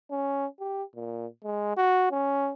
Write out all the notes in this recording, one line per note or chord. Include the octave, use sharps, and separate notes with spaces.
C#4
G4
A#2
G#3
F#4
C#4